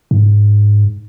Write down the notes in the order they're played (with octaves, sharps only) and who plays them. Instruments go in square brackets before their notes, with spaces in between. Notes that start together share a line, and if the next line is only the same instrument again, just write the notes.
[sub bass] G#2